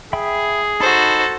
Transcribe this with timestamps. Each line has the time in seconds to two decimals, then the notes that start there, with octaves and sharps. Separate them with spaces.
0.13 G#4 E5 G5 B5
0.80 D#4 F#4 A4 C5 A5 B5